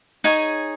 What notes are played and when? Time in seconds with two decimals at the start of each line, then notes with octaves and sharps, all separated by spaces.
0.24 D#4 G#4 C#5 G#5